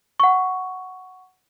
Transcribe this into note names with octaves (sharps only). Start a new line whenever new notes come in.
F#5 C#6